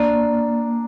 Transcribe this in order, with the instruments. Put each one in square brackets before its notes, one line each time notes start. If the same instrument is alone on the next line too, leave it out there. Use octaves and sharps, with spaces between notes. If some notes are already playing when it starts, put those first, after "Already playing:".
Already playing: [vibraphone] A#3 [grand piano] D4